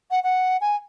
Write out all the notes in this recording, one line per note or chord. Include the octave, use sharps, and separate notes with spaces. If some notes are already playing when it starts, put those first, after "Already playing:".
F#5
F#5
G#5